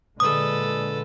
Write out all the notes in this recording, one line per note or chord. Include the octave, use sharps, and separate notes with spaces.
A#2 D3 G#3 A4 B4 D#6